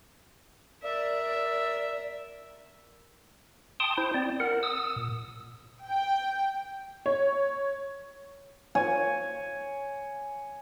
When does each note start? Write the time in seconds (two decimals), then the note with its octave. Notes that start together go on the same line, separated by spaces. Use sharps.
0.83 A#4 D5 E5
3.80 G5 A5 C6 D#6
3.97 E4 C5
4.14 C4 D5
4.40 A#4 F#5
4.63 D#6 E6
4.96 A#2
5.86 G5
7.06 C#5
8.75 C#5 G#5